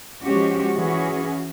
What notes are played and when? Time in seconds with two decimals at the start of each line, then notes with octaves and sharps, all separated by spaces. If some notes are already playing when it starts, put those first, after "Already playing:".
0.22 F3 G#3 C#4 F#4 G4
0.76 E3 C#4 F#4 G#4